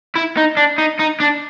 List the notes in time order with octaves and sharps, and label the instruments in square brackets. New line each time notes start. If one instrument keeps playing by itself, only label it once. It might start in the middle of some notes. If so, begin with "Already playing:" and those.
[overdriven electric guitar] E4
D#4
D4
D#4
D#4
D4